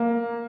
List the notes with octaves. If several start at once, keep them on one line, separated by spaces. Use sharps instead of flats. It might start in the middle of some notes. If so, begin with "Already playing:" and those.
Already playing: A#3